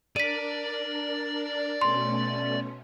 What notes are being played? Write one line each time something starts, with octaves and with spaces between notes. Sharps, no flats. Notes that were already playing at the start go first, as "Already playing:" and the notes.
D4 A#4 D5 B6 D#7
B2 A3 C#4 C6